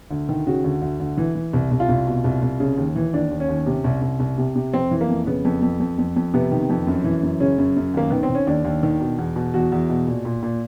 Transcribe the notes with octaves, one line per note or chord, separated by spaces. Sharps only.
D2
D#3
C#3 F#4
D2
D2
D2
E3
E3
C2
C2
F4
C2
B2
C2
C2
C#3
D#2
E3
D#2 D4
D#2
C#4
D#2
C3
C2
C2
C2
C3
C3
F2 C4
E3
A#3
F2
C#3 B3
F2
F2
F2
F2
F2
C3 B3
D#3
F2
F#2
E3
F#2
C#3 C#4
F#2
F#2
D#2 A#3
D#3 B3
C4
D#3
C#4
D#2 D4
D#2
D#3
B2
E2
B2
E2 F#4
E2
B2
A#2
A#2
A#2